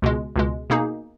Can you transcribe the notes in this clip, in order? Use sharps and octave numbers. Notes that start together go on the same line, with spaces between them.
C#2 B2 G#3
C#2 B2 G#3
B2 A#3 D#4 G#4